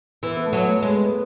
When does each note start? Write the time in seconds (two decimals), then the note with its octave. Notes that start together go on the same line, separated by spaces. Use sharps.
0.23 E3 B3
0.37 B3
0.46 A3
0.53 F#3
0.68 A3
0.83 G#3
0.89 B3
1.06 B3